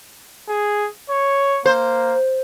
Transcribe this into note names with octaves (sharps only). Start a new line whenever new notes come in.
G#4
C#5
A#3 C5